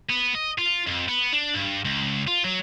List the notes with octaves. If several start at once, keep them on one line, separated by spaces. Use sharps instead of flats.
B3
D#5
F4
F2
B3
D4
G2
C#2
F4
F#3